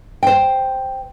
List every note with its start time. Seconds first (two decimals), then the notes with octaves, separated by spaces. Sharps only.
0.23 C5 G5